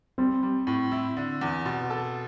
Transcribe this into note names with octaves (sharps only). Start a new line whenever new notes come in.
G3 C4
G3
A2
E4
D3
E2
B2
A4